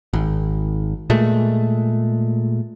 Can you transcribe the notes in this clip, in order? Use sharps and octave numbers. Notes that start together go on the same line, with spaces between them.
G#1
A#2 G#3 A3